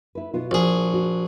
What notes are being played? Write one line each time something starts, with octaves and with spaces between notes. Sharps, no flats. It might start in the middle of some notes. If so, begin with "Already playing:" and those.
E4 B4
B2 B3 F4
A#1 F#4 G#4
F#4